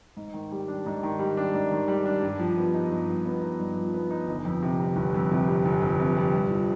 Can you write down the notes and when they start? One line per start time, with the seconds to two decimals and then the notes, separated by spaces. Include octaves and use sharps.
0.17 G#2
0.34 D#3
0.52 G3
0.68 D4
0.86 G#2
1.03 D#3
1.19 G3
1.37 D4
1.54 G#2
1.71 D#3
1.88 G3
2.06 D4
2.22 G2
2.40 F3
2.57 B3
2.74 D#4
2.91 G2
3.08 F3
3.26 B3
3.42 D#4
3.60 G2
3.77 F3
3.94 B3
4.11 D#4
4.27 G1
4.45 F2
4.62 C3
4.80 G3
4.96 G1
5.14 F2
5.31 C3
5.48 G3
5.65 G1
5.82 F2
5.99 C3
6.17 G3
6.34 G2
6.50 F3